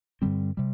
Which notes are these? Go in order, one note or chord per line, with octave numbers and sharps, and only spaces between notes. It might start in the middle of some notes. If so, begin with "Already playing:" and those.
G2 D3 G3 C4
C3 G3